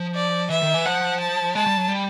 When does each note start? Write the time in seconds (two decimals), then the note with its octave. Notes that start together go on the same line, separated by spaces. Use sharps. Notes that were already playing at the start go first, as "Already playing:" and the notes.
Already playing: F3
0.15 D5
0.50 E3 E5
0.63 D#3
0.74 E3
0.86 F3 F#5
1.20 A5
1.55 G#3 A5
1.66 G3
1.77 F#3
1.88 G3